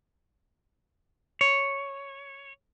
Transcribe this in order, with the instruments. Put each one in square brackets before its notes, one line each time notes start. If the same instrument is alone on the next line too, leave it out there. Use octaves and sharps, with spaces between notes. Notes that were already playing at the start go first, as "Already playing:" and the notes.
[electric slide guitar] C#5